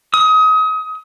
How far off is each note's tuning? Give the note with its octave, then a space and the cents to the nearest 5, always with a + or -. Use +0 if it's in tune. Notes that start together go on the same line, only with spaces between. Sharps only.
D#6 +30